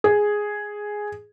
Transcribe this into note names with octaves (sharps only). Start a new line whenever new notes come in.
G#4